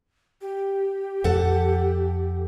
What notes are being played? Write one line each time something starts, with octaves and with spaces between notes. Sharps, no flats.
G4
F2 A4 F#5